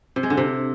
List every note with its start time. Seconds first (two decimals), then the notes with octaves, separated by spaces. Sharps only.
0.16 C3
0.23 G#3
0.30 D3
0.37 C3